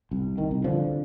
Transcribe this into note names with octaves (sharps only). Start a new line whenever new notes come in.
C2
D#3
C2
D3 F3